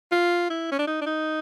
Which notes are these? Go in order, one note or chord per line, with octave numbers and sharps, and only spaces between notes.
F4
E4
C#4
D4
D#4
D4
D#4